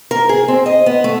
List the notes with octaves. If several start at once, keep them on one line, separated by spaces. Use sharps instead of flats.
A#4
G#4
C4
D#5
B3
A3